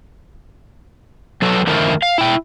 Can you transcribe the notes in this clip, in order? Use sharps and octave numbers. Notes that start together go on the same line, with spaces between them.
F#3 A4 B4
D3 D#3 F3 A3 E4 A#4
F5
E4 G5